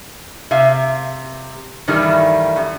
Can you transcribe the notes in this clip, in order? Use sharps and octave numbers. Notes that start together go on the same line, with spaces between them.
C3 E5 F5
G2 D#3 E3 G3 A3
F#2